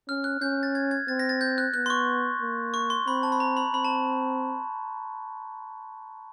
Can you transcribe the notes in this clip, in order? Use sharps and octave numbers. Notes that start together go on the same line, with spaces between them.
C#4 F6
F#6
C#4 G6
A6
G#6
G#6
C4 A6
A#6
A6
G6
F#6
B3 F#6
C6
C#6
A#3
C#6
C6
C4 B5
A5
B5
A#5
B5
C4 B5
A5